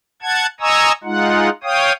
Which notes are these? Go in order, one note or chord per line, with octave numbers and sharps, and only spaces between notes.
F#5 A5 G#6
D#5 G#5 A#5 C#6 D#6 E6
G#3 D#4 F4 F#5
C#5 F5 G5 D#6